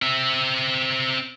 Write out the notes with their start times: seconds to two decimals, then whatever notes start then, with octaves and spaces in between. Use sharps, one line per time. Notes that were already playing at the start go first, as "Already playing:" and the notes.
0.02 C4 E5